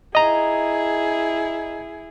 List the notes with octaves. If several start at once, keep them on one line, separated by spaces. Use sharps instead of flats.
E4 G#4 D#5 A#5